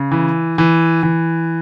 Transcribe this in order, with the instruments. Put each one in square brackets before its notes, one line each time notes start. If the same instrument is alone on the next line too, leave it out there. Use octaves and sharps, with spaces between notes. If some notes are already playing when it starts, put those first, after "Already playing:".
Already playing: [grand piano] C#3
E3
E3
E3